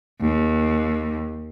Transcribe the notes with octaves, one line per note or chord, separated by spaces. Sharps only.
D#2